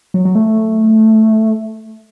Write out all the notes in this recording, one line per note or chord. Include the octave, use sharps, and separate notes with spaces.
F#3
F#3
A3